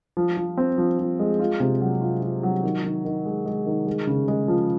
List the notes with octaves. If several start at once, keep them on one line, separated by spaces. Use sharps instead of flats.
F3
F3
C4
F3
F3
G#3
F4
C3
F#3
F4
F4
F#3
D#3
D#3
D#3
G#3
G#3
D#3
G#3
C#3
G#3
F3